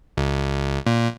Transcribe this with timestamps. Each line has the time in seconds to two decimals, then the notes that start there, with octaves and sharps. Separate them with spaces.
0.17 C#2
0.86 A#2